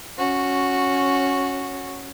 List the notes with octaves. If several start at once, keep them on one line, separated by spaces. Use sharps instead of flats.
C#4 F#4